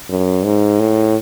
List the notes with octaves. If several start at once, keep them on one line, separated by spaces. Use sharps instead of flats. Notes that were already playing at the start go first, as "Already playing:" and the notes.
F#2
G#2
A2